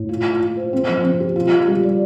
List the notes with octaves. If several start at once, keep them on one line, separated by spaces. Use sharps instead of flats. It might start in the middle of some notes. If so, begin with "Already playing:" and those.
Already playing: A2
F4
F4
F4
C5
C4
F3
C4
G4
F4
F4
G3
D5